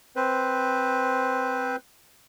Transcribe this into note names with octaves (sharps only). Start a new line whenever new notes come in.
C4 B4 C5